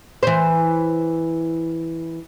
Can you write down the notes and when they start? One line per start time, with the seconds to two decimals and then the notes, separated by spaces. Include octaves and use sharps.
0.23 E3 C5